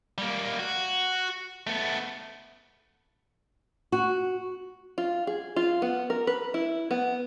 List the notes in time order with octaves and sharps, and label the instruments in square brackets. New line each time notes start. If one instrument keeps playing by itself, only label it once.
[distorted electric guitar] G3 A#3
F#4
A3 B3
[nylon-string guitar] F#4
[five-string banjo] F4
G#4
F4
B3
A#4
B4
E4
B3